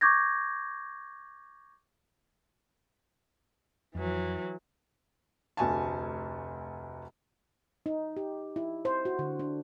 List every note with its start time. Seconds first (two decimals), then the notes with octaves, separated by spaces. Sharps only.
0.01 C#6 D6 G6 G#6 A#6
3.95 F2 E3 F#3
5.57 F1 D2 G#5 A5
7.86 D#4
8.17 G4
8.56 E4
8.85 C5
9.05 F#4
9.19 D3
9.39 D4